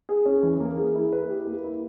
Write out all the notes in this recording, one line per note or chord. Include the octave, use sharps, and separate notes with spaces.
G#4
C#4
E3
A#3
G#4
E4
B4
G4
A#3
E4